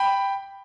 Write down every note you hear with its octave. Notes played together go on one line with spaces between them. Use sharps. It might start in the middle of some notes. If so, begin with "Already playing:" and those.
Already playing: G5 B5